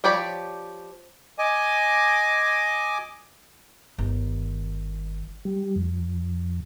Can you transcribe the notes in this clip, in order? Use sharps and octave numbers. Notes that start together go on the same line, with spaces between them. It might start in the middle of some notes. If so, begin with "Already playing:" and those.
F3 G4 C#5 D5 B5
D#5 G#5 D6
G1 D#3
G3
F2